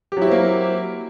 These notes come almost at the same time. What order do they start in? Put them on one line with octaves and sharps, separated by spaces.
G4 F#3 E4 C4 A#3